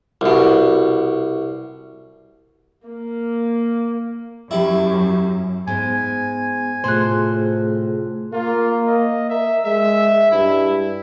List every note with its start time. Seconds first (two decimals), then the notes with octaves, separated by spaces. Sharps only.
0.21 C2 B2
2.87 A#3
4.51 F#2 G3 E4
5.67 G#2 B3 G#5
6.84 A2 C3 A3 F4 G#4 C5 C6 F#6
8.33 A#3 F4
8.87 D#5
9.29 A#4 E5
9.65 G#3 E5
10.32 G2 E4